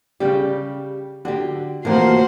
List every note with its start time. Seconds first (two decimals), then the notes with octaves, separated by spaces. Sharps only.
0.20 C#3 G3 G4
1.25 D3 F#4 G4
1.85 D2 C3 E3 F3 A#3 F#4 A#4 C5